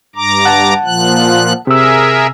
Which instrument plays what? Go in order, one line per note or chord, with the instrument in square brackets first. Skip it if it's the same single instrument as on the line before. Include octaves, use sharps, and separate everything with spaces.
[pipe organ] G2 A#5 D6
[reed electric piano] F#5 A5
[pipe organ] A#2 F3 F#6
[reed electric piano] C3 E6 [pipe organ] G#4 A#4 E5